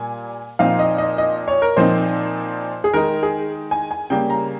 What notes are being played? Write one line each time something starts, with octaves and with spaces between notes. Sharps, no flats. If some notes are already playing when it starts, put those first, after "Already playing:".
Already playing: A#2 G3 G#5
A#2 F3 C4 D#4 F5
D#5
D#5
D#5
C#5
A#4
A#2 F3 C4 D#4 C5
G#4
D#3 G#3 D#4 A#4
G#4
G#5
G#5
C#3 G3 A#3 C#4 G5
A#5